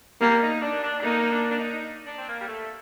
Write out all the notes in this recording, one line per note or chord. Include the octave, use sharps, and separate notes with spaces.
G3 A#3
D#4
D4
D4
D4
A#3 D#4
D4
D4
D#4
D4
C4
A#3
G3
A3